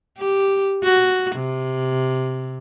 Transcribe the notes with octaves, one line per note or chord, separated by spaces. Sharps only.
G4
F#4
C3